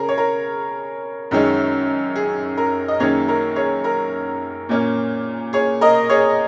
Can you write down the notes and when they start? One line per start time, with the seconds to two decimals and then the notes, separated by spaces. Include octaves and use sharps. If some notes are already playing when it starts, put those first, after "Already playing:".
Already playing: C#3 C#4 G#4 A#4
0.09 C#5
0.18 A#4
1.31 F#2 D#3 G#3 C#4
2.16 G#4
2.57 A#4
2.88 D#5
3.00 F#2 D#3 A#3 C#4 G#4 C#5
3.28 A#4
3.56 G#4 C#5
3.84 A#4
4.69 A#2 A#3 C#4
5.53 G#4 C#5
5.81 A#4 D#5
6.10 G#4 C#5